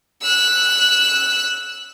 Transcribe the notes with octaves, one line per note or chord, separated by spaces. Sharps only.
E6 F#6